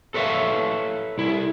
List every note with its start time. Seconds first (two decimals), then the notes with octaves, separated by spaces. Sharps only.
0.14 A4 B4 C#5 D5 E5 F5
1.18 C2 E4